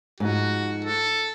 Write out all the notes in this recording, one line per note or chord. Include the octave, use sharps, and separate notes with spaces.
G#2 F3 D#4 F#4
A4